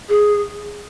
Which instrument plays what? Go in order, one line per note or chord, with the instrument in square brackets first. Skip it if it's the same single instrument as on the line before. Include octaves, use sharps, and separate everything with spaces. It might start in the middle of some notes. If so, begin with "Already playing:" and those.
[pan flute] G#4